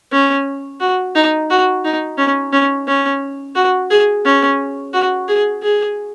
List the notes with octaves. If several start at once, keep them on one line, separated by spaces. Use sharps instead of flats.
C#4
F#4
D#4
F#4
D#4
C#4
C#4
C#4
F#4
G#4
C#4
F#4
G#4
G#4